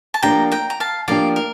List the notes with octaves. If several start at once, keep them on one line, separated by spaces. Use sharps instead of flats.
A5
F3 A#3 D4 G4 G5 A#5
G5 A#5
A#5
F5 A5
F3 A#3 D4 G4 D5 F5
A#4